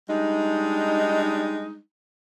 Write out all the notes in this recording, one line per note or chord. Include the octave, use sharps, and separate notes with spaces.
G3 G#3 D4 D#4